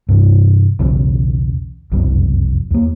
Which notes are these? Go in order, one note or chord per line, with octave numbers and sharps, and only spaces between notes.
G2 C3 E3
B1 E2 C#3
F#1 C2 F2 C3
E2 A#3